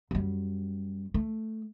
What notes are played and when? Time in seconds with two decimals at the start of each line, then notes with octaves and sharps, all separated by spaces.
0.11 F#2 G3
1.14 A3